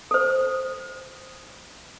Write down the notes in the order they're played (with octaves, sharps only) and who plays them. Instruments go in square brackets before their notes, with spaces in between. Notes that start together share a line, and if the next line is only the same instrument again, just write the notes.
[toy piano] A4 C5